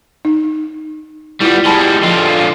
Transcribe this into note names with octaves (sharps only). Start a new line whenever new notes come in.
D#4
G3 B3 E4 F4
G3 G#3 A5 B5
D3 F3 F4